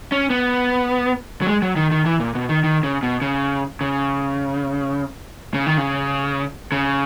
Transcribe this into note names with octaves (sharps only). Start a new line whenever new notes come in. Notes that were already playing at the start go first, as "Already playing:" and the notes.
C#4
B3
F#3
G#3
F#3
D#3
D#3
E3
A#2
B2
D#3
D#3
C#3
B2
C#3
C#3
C#3
D#3
C#3
C#3